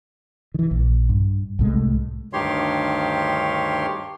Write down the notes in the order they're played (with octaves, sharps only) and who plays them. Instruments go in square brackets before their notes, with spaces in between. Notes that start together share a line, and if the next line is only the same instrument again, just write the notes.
[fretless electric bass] D#3 E3
A#1
G2
C2 A2 G#3
[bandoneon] D2 G2 D#3 G4 C#5 C6